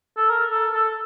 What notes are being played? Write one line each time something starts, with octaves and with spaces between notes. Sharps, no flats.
A4
A#4
A4
A4